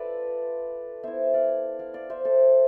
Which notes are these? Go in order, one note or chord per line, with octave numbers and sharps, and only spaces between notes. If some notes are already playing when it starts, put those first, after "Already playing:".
Already playing: F4 A4 B4 D5 E5
B3 E4 C5 E5
D5 F5
D5 F5
D5 F5
C5 E5
A4 C5